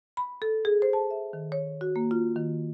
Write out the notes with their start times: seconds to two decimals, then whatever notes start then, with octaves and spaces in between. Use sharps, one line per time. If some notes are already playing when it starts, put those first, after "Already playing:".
0.17 B5
0.42 A4
0.65 G#4
0.82 C5
0.93 A5
1.10 E5
1.33 D#3
1.52 C#5
1.81 F#4
1.96 A#3
2.11 F4
2.36 D#3